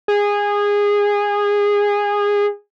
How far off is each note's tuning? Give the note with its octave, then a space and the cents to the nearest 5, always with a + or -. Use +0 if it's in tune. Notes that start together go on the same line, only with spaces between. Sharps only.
G#4 -20